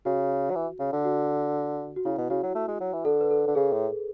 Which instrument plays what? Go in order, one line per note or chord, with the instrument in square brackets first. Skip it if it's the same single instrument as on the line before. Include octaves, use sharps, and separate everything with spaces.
[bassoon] C#3 [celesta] F#4
[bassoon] F#3
E3
C#3
D3
[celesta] F#4
F#4
[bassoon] C#3 [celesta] E4
[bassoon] B2
[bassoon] C#3 [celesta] F#4
[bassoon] F#3
A3
G#3
F#3
E3
[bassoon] D3 [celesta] A4
[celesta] B4
A4
[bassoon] D3
[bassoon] C#3 [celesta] G#4
[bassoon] A2